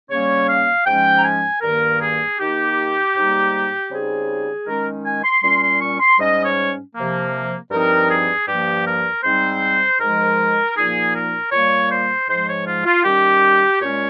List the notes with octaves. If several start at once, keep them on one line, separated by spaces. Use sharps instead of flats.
C#3 G3 A#3 C#4 C#5
F5
G#2 F3 G#3 C#4 G5
A#5
G#5
G2 D#3 A#3 A#4
G#4
D#3 A#3 D#4 G4
G#2 G3 A#3 D#4
C#3 G3 C4 D#4 G#4
D#3 G#3 C#4 A#4
G#5
C6
A#2 G3 C#4 C6
C6
C#6
C6
G#2 G3 C#4 D#5
C#5
C3 F3 A#3
G2 F3 C4 D#4 A#4
G#4
G2 F3 A#3 G4
A#4
G#2 G3 C4 D#4 C5
G#2 F3 G#3 D#4 A#4
A#2 F3 A#3 D#4 G#4
A#4
A#2 G3 A#3 C#5
C5
G#2 F3 G#3 C5
C#5
F4
F4
D#3 G3 C#4 G4
A#2 G#3 C#4 C#5